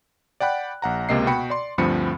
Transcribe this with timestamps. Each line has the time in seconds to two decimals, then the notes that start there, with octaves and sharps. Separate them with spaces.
0.40 D5 F#5 G5 B5 F#6
0.82 A#1 F#5 A#5
1.09 C#2 C3 A#3 D#5 C7
1.26 B2 F#4 G5 B5 C#7
1.50 D5 C6
1.78 D2 G2 F3 C4 B5 C#7